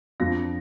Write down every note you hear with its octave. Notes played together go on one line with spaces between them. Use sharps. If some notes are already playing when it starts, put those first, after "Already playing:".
F2 F3 D4 F4 A#6